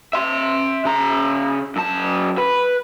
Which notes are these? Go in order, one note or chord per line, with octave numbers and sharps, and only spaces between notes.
E5 C6
C#3 A#5
F#2 A5
B4